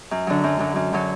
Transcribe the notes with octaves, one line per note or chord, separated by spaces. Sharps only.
F#2
D3 F#3
F#2
D3 F#3
F#2
D3 F#3